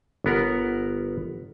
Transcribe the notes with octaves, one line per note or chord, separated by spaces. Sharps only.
G1 B3 A#4 F#5